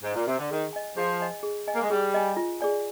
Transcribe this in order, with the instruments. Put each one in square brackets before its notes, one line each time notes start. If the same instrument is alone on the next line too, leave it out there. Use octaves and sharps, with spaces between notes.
[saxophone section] G#2
A#2
C3
D3
[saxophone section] D#3 [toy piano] G#4
[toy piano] D#5 G#5
[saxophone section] F3 [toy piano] G#4
[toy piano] D#5 G#5
G#4
D#5 G#5
[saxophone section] A#3
G#3
[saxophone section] G3 [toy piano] G#4
[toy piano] D#5 G#5
F4
G#4 D5 G#5